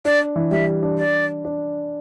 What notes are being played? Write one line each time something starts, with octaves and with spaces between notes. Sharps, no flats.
D4 D5
E3
G3 E5
D4
D5
D4